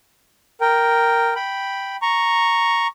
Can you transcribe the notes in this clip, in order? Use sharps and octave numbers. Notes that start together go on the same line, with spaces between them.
A#4 G5
G5 B5
A#5 C#6